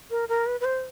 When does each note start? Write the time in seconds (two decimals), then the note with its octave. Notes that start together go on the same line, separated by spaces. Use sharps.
0.11 A#4
0.29 A#4
0.47 B4
0.60 B4
0.65 C5